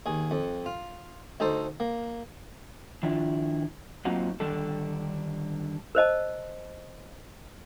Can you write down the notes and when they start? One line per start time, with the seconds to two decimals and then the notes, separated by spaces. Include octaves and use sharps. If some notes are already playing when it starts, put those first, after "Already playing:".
0.06 D#2 G#4
0.31 F2
0.66 F4
1.40 D2 D#4 A4 C5 A5
1.80 A#3
3.03 D#3 F3 D4 E4 F4
4.05 F#3 A#3 C4 D#4 F4 F#4
4.40 D3 D#3 G3 D4 A4
5.95 A#4 C5 D#5 A5